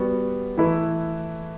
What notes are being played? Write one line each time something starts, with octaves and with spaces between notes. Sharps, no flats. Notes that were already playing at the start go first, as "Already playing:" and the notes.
Already playing: G3 B3 F#4
E3 A3 E4 B4